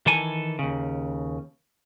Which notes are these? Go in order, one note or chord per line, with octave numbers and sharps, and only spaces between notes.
D#3 E3 A4 G#5
D#2 C#3